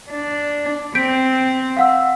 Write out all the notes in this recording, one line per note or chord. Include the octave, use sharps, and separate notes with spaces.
D4
C4 G6 B6 D7
F5 F#5 E6